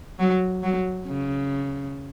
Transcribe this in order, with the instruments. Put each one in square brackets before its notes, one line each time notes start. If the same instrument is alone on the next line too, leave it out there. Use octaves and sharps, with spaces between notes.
[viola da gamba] F#3
F#3
C#3